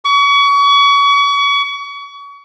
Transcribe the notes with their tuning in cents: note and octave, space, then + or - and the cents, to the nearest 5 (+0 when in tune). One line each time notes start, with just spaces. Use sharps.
C#6 +35